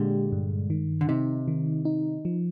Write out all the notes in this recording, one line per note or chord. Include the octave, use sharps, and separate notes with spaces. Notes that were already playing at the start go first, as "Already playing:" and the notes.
Already playing: A#2 D3 G#3 G4
G2
D#3
D3
C3 D#4
D#3
D#4
F3